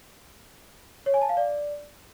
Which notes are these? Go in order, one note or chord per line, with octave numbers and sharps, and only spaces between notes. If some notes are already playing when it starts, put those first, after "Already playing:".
C#5
G#5
A5
F5
D5